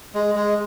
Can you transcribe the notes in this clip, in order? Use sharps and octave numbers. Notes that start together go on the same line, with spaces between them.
G#3
G#3